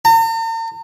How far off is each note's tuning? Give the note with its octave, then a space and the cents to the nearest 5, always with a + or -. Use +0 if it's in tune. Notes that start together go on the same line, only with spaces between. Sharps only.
A#5 -45